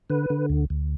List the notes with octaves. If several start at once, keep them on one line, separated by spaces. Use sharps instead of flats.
D3 B4
D3
D2
D2